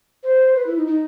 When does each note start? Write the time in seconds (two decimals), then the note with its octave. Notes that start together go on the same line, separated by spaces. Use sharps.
0.23 C5
0.55 B4
0.66 E4
0.77 D#4
0.87 D#4